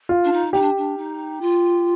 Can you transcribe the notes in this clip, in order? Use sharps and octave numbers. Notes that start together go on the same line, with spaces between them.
F4
D4
D#4
D#4 G4
D4
D4
D#4
F4